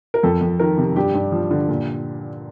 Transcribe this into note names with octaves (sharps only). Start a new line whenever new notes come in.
A#4
F2 A4
F2
D#3 A#4
C3
G2 G4
G2
F3
D3
A#2